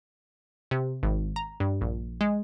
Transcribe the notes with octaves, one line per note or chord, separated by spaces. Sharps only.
C3
G#1
A#5
G2
A#1
G#3